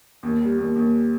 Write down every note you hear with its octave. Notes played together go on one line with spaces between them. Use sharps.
D#2
G3
D#2
D#2